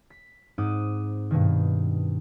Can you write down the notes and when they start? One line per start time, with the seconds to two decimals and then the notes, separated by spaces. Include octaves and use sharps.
0.10 B6
0.58 G#2 C4 D#4 D6 D#6 F#6
1.31 G2 B2 D#3